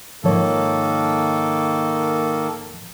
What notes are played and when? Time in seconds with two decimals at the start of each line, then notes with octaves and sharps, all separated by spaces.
0.24 G#2 D#3 F3 A#3 A4 C#5